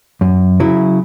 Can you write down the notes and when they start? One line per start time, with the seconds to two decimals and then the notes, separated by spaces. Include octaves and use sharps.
0.21 F#2
0.60 C#3 F#3 E4